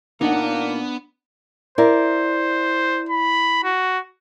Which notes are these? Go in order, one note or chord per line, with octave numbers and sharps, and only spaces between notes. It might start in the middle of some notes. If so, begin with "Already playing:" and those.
A#2 A#3 B3 D4 D#4 F#5
E4 A#4 C5 D5
B5
F#4